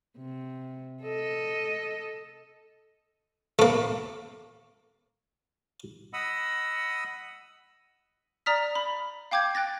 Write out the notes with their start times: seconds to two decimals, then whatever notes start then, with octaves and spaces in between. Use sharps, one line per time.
0.17 C3
1.03 A4 D#5
3.59 A3 A#3
6.13 D#5 F#5 B5 D#6 E6
8.46 D5 A#5 D#6 F6 B6
8.75 B5
9.31 F5 G5 D6 G6 G#6
9.55 G5 F#6 A6 A#6